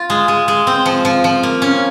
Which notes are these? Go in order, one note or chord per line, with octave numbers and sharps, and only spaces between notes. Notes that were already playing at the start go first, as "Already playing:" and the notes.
Already playing: F4
G#3
G#3
G#3
C4
F3
F3
F3
A#3
C#4